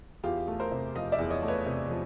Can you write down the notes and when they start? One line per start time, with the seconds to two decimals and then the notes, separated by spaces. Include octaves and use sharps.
0.23 E2 F4 G4
0.48 A3
0.60 A#4 C5
0.71 C3
0.96 F3 D#5 F5
1.12 D5 E5
1.19 E2
1.30 C#5 D#5
1.43 A3
1.48 B4 C#5
1.66 C3
1.90 F3